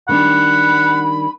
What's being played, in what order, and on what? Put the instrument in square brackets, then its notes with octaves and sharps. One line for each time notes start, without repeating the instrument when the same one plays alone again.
[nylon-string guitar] D#3 G3 D4 [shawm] F#5 [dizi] B5